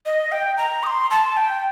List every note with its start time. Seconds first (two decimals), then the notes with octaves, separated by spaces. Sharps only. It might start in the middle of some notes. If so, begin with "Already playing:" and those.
0.06 D#5
0.32 G5
0.57 A#5
0.83 D#6
0.87 C6
1.11 A5
1.37 G5